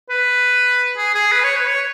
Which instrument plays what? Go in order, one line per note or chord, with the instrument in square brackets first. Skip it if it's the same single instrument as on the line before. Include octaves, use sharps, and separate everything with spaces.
[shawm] B4
G#4
G#4
B4
C#5
B4
C#5